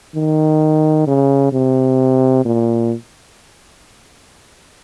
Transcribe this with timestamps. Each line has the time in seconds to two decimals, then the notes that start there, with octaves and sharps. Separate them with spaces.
0.15 D#3
1.07 C#3
1.52 C3
2.45 A#2